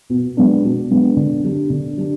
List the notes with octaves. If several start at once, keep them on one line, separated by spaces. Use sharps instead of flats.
B2
G#3 B3 D4
B2
G#3 B3 D4
D3
G3 D4
D3
G3 D4